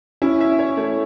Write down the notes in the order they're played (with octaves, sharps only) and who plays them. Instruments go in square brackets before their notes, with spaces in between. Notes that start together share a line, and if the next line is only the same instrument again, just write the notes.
[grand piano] C#4 [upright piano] E4
[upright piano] E5
C#5
A3